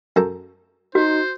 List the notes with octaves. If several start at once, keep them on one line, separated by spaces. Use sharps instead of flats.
F#2 A4 A#5
D#4 F#4 C5